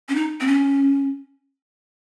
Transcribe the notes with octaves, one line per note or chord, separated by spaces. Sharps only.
C#4
D#4
C4
C#4